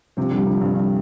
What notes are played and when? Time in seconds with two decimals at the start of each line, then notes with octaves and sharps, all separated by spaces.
0.17 C3 F3
0.31 D3 G3
0.45 C3 F3
0.60 G2 C3
0.74 G2